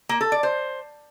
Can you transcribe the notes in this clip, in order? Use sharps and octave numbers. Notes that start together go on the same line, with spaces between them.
A#3
A4
D5
C5